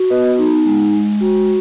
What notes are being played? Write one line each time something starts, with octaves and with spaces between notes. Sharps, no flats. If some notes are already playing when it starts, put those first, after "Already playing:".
Already playing: F#4
B3 B4 D#5
D#4
G#3
G#3
F#4